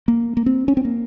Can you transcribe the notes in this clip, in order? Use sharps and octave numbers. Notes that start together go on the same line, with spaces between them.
A#3
A#3
C4
C#4
C4
A#3